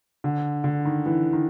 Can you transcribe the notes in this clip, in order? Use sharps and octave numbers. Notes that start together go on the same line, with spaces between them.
D3
D3
D#3
E3
D#3